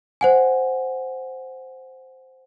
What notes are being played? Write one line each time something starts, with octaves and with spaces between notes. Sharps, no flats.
C5 F#5 G#5